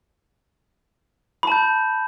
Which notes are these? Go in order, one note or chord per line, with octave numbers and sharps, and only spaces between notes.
A5 B5 G6